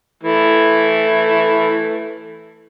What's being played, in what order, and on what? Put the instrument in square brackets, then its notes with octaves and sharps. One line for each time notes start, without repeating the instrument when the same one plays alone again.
[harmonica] E3 A3 E4